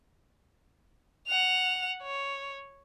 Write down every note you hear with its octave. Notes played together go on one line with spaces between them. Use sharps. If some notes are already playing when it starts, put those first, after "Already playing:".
F#5 F7
C#5